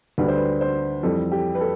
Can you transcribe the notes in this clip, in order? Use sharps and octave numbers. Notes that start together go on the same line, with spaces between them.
D2 D3 G3 B4
C5
B4
C5
F2 E3 G3 A4
G4
B4
A4